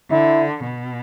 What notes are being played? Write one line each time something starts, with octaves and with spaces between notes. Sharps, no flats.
D3 E4
B2